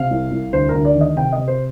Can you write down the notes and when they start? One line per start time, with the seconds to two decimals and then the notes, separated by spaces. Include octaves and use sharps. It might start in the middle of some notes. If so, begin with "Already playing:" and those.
Already playing: C3 F5
0.11 C2
0.31 C2
0.53 D2 C5
0.69 A#4
0.74 D2
0.85 D5
0.95 D#3
1.01 D#5
1.16 C3 G5
1.32 D#5
1.38 C3
1.48 C5